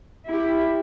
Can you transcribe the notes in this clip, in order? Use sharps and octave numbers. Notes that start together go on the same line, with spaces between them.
E4 G4